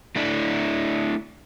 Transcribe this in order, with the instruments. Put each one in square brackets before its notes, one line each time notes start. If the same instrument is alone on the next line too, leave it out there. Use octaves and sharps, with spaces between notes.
[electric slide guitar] A3 D4 E4 D5